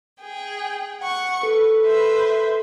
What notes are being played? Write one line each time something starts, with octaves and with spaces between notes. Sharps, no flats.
G#4 G5
F#5 C#6
A4 B4
B4 C5 E5